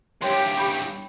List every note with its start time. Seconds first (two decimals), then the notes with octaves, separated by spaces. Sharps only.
0.22 E2 G2 G4 C#5 C6
0.57 G5 B5 C#6